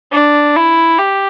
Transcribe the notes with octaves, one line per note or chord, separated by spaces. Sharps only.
D4
E4
G4